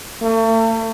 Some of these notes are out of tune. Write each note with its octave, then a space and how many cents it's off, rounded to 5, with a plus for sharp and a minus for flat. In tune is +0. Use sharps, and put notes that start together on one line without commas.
A3 +40